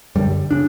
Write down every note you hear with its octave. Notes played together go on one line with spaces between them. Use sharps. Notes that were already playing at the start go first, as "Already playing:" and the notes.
F#2 D3 G3
C#3 D4